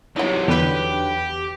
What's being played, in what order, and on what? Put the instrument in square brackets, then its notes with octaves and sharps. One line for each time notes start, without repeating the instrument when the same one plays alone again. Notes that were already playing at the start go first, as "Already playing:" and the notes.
[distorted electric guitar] C3 E3 [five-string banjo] F#3 D#4
[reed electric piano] E2 [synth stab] D3 B4 [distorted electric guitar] G4